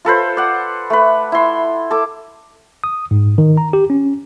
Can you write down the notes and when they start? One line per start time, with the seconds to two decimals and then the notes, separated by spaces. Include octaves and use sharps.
0.05 F4 A4 B4 C5
0.37 D5 F#5
0.90 A3 B4
1.32 E4 C6
1.91 A4 D6
2.84 D#6
3.11 G#2
3.38 D#3
3.57 A#5
3.73 G4
3.90 C#4